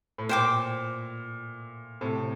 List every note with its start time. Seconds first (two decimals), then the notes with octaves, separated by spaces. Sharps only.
0.18 A2
0.29 A#2 C5 G5 D6
2.01 A2 C3